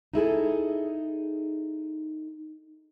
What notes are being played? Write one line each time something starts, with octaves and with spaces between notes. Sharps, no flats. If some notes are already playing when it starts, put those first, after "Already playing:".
D#4 E4 G#4 A4